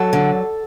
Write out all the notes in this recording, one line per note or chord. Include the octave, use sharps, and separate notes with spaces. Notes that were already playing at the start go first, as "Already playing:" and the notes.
Already playing: F#3 A4
D3